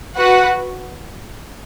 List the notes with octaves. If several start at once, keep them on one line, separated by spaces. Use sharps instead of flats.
F#4 B4 F#5